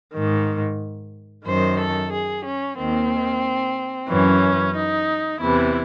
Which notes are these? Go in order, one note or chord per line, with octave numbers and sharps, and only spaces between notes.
G#2 D#3
F#2 D#3 C5
A4
G#4
C#4
D#2 D#3 C4
F#2 E3 C#4
D#4
E2 C3 E3 E4